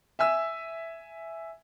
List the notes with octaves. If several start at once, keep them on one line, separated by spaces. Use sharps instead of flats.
E5 G#5 E6